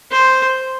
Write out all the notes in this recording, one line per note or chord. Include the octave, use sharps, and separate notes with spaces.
C5